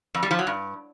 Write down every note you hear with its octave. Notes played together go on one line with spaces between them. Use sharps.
F2
G3
F3
F#3
G2